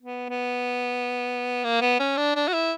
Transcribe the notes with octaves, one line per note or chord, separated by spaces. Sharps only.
B3
B3
A#3
B3
C#4
D4
D4
F#4
E4